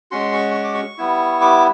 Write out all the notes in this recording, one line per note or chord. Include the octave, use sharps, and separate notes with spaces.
G#3 C#4 F#4 C6
C#6
C#6
D6
C#6
G3 B3 E4
D6